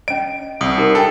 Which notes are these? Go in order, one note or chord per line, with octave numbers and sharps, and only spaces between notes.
C#4 D#5 D7
C2 D#6
D#4 G4 A#4
D4 A4 G5